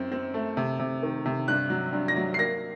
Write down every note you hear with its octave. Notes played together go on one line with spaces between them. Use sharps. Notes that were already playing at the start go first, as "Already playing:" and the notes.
Already playing: F#2 C4
C4
A3
C3
C3
D#3
C3
G2 F#6
F#3
G2
A#6
F#3
C7
A#3 A#6